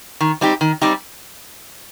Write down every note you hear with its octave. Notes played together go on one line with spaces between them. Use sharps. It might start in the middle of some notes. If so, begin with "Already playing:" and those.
D#3
G3 C4 D#4 G4
D#3
G3 C4 D#4 G4